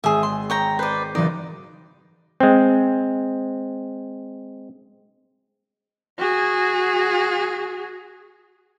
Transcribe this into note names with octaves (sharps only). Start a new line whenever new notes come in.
G#1 G#4 E5
C6
C#5 G5 A#5
B4 C5 D5 D#7
F#1 E3 D#4 D5
G#3 C4
F#4 G#4